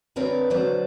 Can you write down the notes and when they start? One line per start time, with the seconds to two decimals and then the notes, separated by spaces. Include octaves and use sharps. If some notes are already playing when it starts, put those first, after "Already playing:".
0.16 D3 C4 A#4 B4 C#5 D5
0.50 D3 F#3 C5 D5